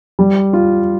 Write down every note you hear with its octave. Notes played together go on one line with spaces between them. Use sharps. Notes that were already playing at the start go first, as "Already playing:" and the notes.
G3
F4